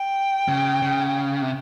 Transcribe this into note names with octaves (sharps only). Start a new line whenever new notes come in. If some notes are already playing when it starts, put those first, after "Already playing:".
Already playing: G5
C#3
C#3
C3